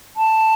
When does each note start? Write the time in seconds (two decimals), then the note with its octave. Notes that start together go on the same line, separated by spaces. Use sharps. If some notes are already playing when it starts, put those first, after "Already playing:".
0.17 A5